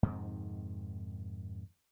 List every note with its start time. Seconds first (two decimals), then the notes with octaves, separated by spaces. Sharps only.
0.03 F2 G#2 C3 D#3